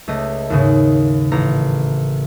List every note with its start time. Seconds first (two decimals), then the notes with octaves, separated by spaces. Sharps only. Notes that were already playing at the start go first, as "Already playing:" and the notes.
0.08 C#2 A3 D#5
0.50 D#2 G#2 C#3
1.32 A1 A#5